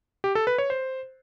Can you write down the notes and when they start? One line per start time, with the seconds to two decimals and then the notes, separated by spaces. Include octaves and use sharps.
0.24 G4
0.35 A4
0.47 B4
0.58 C#5
0.70 C5